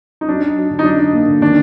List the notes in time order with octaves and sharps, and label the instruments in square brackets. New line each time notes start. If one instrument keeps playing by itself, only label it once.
[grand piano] D#4
[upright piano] F#3 [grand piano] D4
[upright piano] F#3
F#3
D3
[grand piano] D#4
[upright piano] F#3 [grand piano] D4
[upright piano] F#3
A#3
D3
[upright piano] D#3 [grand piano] D4